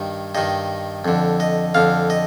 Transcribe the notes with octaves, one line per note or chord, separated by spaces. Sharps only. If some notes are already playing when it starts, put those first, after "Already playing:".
Already playing: G2 D#3
G2 D#3 D#5
F2 D3
D#5
F2 D3 F5
D#5